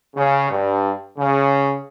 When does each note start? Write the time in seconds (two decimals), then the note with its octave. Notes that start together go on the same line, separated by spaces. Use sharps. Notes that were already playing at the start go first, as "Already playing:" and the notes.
0.14 C#3
0.50 G2
1.17 C#3